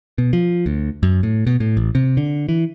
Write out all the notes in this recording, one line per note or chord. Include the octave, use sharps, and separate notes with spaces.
B2
F3
D2
F#2
A2
B2
A2
A1
C3
D3
E3